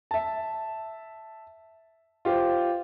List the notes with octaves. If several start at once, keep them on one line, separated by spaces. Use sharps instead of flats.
E5 A5
F4 G4 C5